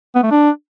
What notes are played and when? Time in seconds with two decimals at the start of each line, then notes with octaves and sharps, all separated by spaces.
0.15 B3
0.23 A3
0.31 D4